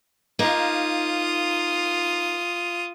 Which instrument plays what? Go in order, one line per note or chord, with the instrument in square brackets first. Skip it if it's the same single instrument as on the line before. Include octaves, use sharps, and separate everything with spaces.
[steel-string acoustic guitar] A#3 D#4 [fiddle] F4 D#6